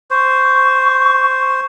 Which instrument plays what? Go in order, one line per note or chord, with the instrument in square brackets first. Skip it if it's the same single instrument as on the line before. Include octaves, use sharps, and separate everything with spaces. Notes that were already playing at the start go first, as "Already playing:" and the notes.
[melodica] C5 [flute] C#6